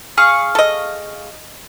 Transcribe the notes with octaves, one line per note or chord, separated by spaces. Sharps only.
G#4 F5 C#6
A4 D#5